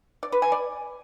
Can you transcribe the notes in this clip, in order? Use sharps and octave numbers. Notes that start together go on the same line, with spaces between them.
D5
B4
G#5
D5